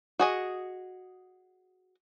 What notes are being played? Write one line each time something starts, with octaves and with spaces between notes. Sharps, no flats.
F#4 G#4 D#5